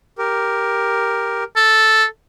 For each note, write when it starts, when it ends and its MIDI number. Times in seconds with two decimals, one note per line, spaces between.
0.18 1.44 67
0.18 1.44 70
1.56 2.05 69